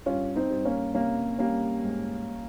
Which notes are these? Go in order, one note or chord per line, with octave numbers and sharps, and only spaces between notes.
G2 C#4 F4
C4 D#4
G2
A#3 C#4
C3 A#3 C#4
G3 A#3 C#4
G#2